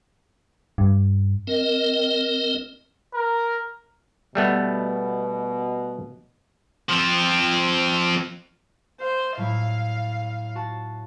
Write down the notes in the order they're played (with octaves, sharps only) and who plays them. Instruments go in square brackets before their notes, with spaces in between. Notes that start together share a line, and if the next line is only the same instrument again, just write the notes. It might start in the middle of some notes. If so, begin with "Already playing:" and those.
[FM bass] G2
[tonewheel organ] C4 A#4 D#5
[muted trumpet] A#4
[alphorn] B2 [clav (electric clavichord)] G3 A3 B3
[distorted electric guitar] F3 C4
[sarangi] C5 [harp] F5
[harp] A2 F#3 E4 [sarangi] F5
[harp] F#4 A5